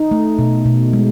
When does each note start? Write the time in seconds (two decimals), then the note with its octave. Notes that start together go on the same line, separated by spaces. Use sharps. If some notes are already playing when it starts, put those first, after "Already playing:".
Already playing: D#4
0.11 A3
0.39 B2
0.66 B2
0.93 G#3